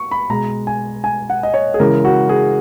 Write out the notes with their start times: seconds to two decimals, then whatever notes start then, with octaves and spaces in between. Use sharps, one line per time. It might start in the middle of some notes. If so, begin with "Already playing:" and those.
Already playing: C#6
0.11 B5
0.30 B2 G#3 A#5
0.67 G#5
1.04 G#5
1.30 F#5
1.43 D#5
1.54 C#5
1.74 G#4
1.80 C#3 E3 G#3 A#4
2.05 F#4
2.29 G#4